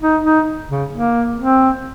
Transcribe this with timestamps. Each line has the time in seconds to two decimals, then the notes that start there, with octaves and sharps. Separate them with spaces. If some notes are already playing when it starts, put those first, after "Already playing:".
0.01 D#4
0.24 D#4
0.69 C#3
0.92 A#3
1.38 C4